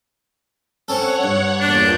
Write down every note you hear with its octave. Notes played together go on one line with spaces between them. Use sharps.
C4 C#4 A4 C#5 F#5
G2
E2 A#2 D4 G6